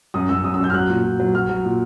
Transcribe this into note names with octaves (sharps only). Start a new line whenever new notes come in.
F#2 D#6
F#2 E6
F#2 D#6
E6
F#2 G6
F6
F#3 F#6
A#2
A#2
F#3
F#3 F6
F#3
A#2